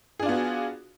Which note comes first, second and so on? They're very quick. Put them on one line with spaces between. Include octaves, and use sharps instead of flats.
G#4 D4 F4 B3 F#4